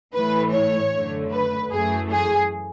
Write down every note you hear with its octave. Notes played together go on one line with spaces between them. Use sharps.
A2 E3 A3 B4
C#5
F#2 D3 A3
B4
F#2 E3 A3 G#4
G#4